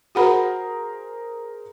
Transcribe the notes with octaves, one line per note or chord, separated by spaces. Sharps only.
F#4 G#4 A#4 C5 F#5 B5